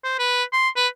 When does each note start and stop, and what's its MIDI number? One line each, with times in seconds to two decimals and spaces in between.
0.04 0.19 72
0.19 0.43 71
0.53 0.69 84
0.77 0.87 71